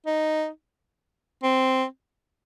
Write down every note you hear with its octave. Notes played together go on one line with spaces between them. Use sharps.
D#4
C4